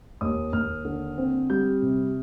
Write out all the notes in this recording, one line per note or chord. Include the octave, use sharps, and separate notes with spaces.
D#2 D#6
D#2 F6
D3
C4
G3 G6
C3